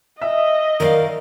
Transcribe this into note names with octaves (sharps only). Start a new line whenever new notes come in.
D#5 E5
D#3 A#4 D5 F5